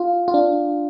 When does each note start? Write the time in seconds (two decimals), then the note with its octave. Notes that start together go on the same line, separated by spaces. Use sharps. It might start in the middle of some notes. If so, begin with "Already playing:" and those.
Already playing: F4
0.28 F4
0.34 D4